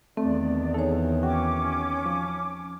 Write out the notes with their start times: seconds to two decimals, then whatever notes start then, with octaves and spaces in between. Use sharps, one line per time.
0.17 E2 D#3 A3 C4 D5
0.74 D#4 G#4 A4 C#5
1.23 C#4 F#4 G5 D6
2.06 F3